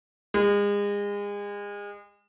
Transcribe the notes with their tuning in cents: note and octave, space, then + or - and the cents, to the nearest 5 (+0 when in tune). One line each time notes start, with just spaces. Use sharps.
G#3 -35